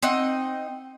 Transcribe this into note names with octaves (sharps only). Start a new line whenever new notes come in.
C4 D#4 D#5 F#5